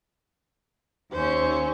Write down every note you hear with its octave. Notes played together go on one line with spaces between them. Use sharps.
D#2 C#4 C5